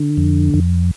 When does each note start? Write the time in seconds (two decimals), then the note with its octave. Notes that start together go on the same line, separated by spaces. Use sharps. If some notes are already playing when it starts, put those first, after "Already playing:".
Already playing: D3
0.17 F2
0.54 F2